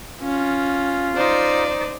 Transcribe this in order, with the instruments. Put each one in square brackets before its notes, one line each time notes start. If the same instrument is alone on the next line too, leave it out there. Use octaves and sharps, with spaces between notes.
[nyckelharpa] C#4 [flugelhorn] F4
[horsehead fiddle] D#4 C5 [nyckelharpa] D5